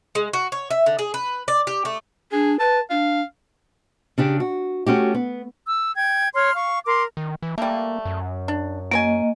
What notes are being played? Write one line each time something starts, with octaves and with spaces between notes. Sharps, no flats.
G#3
F#4
C#5
E5
D3
G#4
B4
D5
G4
A3
D4 G#4
B4 A5
D4 F5
C#3 D4 G4
F#4
A3 C#4 F#4 G4
B3
E6
G5 G#6
C#5 C6 F6
F5 C#6
A#4 C6 D6
D#3
E3
G3 A3 A#3
F#2
D4
A#3 F#4 C5 D#5 G#5